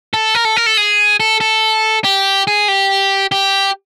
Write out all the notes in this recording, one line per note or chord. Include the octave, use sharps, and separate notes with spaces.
A4
A#4
A4
A#4
A4
G#4
A4
A4
G4
G#4
G4
G4